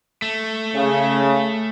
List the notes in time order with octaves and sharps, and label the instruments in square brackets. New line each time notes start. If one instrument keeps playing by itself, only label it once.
[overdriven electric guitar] A3
[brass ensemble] C#3